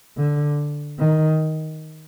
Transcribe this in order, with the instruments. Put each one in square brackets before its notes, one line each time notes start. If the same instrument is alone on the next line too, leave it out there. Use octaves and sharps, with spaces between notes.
[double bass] D3
D#3